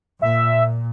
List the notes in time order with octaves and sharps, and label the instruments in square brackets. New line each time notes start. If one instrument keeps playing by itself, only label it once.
[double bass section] A#2 [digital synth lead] E5